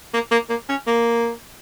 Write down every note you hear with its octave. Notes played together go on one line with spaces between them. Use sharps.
A#3
A#3
A#3
C#4
A#3